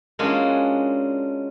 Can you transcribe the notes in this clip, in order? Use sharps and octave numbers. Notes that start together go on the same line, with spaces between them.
G#3 A#3 C#4 D4 F4 F#4